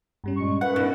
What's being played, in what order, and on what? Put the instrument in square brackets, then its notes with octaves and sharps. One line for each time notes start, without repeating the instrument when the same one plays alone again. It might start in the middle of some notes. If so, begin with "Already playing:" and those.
[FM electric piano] G2 G3 C#4
[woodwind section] A#2 G#3 C#6
[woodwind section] F#2 [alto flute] B4 [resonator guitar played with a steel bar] F#5 [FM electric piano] F#6
[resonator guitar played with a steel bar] B2 [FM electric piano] D4 D#4